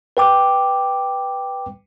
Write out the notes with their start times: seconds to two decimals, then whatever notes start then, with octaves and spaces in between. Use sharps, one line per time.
0.17 B4 G5 D6